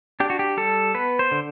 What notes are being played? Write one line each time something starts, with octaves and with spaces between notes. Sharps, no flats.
D4 G4
F#4
G4
G3 A4
B3 B4
C5
D3